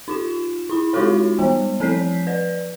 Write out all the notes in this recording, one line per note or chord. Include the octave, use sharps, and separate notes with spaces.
D#4 F4 E7
E4 B5
G#3 D#4 F4 F#4 A4 C#5
E3 G3 B3
F3 C4 A4 G6 B6 C7
B4 D5